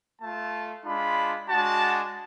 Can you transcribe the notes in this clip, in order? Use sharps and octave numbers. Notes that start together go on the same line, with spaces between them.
A3 F4 A5
G#3 D4 F4 B5
G#3 D4 F#4 A5